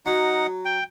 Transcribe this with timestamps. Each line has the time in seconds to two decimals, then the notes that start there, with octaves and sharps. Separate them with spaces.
0.06 F#3 D#4 F#5
0.65 G5